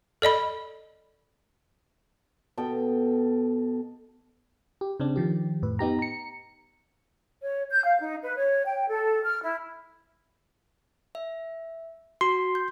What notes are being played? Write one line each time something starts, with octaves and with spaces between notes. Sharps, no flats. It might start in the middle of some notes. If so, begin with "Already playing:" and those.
A4 D5 D#5 B5
B2 A4 G5
G4
C#3 C4 D4
D#3 F3 G4
F2 A2 B4
B3 D#4 G4 A#5
A#5 C#7
C#5
G6
F5
D#4
B4
C#5
G5
A4
F6
E4
E5
F#4 C6
G6